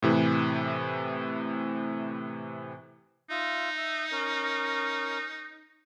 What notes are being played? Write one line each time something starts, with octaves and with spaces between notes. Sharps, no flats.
A2 C3 E3
D#4 F4 E5
E5
C#4 A#4